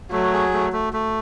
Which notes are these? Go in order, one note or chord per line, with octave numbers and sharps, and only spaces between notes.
F#3 A3
G#4
A3
A3
A3